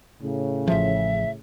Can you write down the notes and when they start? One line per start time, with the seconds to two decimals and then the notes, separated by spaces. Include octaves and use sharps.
0.23 A2 C#3
0.68 A1 F3 E5